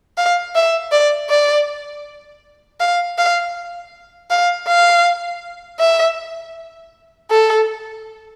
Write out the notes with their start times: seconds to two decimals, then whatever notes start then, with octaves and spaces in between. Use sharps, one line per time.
0.18 F5
0.55 E5
0.92 D5
1.30 D5
2.81 F5
3.18 F5
4.31 F5
4.68 F5
5.80 E5
7.31 A4